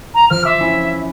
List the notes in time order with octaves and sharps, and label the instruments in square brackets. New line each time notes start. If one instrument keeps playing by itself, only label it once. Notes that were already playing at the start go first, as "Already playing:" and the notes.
[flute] A#5
[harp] F3 [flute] F6
[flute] E5 [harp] C6 D6
[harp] C#4 E4